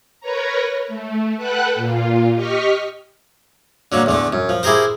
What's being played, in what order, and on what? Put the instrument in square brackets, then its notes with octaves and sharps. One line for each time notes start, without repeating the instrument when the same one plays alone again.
[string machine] A#4 B4 C#5 A#5
A3
A4 B4 F#5 G5 F#6
A#2 F4
G4 D#5 C#6 F6 B6
[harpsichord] D3 F#3 A#3
E2 D3 A3
F#2
F3
E4 G4 G#4 A#4 C5